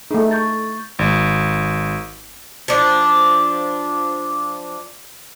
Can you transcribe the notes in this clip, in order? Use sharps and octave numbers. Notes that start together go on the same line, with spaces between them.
A3 D#4 G#4
C#6 G6 A6
G#1
F3 D4